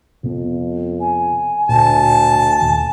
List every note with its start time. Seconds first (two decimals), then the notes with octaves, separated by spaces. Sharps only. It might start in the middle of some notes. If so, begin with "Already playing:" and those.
0.24 F2 C3 B3
1.00 G#5
1.69 D2 A#2 A5
2.61 D#2 A#2 D#3